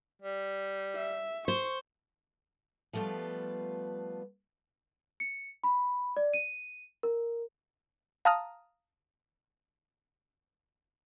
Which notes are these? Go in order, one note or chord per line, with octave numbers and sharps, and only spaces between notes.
G3
E5
C5 C#6
F3 G3 A3 B3 F4
C#7
B5
D5
D#7
A#4
F5 A5 A#5 D#6 F6